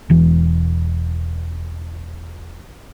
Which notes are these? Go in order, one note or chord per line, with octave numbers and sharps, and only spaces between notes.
E1 E3